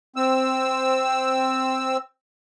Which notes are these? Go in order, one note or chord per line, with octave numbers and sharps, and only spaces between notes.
C4 E6